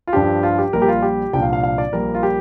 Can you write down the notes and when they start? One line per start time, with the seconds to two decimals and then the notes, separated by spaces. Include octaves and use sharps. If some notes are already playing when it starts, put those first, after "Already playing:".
0.07 F4
0.13 G2 F3 D4 G4
0.43 F4
0.58 G4
0.73 A#1 A#2 G3 A#4
0.82 G4
0.88 F4
1.02 G4
1.33 C2 A#2 F3 D4 G5
1.42 F5
1.53 F5
1.63 F5
1.78 D5
1.92 A#1 A#2 G3 A#3 A#4
2.15 F4
2.23 G4